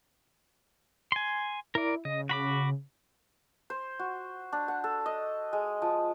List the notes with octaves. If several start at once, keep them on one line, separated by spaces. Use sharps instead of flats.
G#5 C6
E4 A#4 D5
C#3 D#5
F#4 B5 D6
C5
F#4
D4
F#5
A4
D#5
G#3
F3